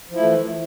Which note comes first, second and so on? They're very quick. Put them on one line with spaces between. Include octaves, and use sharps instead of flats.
F3 E4 A3 E3